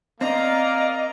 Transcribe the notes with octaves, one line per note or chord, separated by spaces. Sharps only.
A#3 C4 D5 D#5 F5 A#5